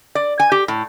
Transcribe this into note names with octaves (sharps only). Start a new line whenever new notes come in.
D5
G#5
G4
A2